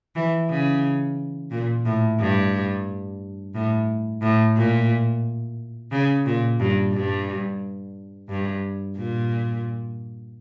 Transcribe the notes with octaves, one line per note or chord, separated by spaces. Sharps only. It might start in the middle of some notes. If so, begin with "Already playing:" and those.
E3
C#3
A#2
A2
G2
A2
A2
A#2
C#3
A#2
G2
G2
G2
A#2